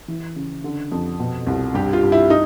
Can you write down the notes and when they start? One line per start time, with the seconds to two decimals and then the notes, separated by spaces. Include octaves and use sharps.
0.08 E3
0.36 C#3
0.64 D3
0.92 F2
1.20 B2
1.47 C2
1.74 G2 G4
1.93 F4
2.03 G2
2.12 E4
2.30 D#4